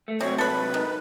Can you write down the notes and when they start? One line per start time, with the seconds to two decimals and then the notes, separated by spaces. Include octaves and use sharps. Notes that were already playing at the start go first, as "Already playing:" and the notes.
0.08 A3
0.20 G#2 C3 F#3 C4 C#5
0.38 A4 B4 B5
0.74 D#3